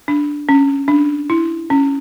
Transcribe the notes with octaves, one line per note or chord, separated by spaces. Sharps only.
D4
C#4
D4
E4
C#4